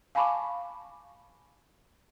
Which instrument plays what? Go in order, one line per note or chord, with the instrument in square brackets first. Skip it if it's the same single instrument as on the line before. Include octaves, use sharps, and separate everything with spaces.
[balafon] F5 G#5 A5 B5 C#6 D6